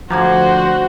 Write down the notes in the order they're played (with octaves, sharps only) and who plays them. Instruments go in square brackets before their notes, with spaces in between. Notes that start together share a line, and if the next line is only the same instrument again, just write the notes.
[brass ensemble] D2 C5 [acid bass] F3 [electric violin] F#4 [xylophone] A#5 D6 G#6